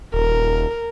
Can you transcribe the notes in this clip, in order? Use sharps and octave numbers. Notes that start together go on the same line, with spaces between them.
D#1 A#4